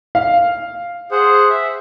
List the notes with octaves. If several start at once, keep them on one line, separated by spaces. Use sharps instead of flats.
F5
G#4 C5 F#5
E5